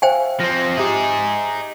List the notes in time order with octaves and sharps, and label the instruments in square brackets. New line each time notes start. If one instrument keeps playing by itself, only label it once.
[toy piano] C5 G5 G#5 [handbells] E5 F5
[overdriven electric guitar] F3 C4 [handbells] A#6
[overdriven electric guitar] D#4 G#4 [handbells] G4 E5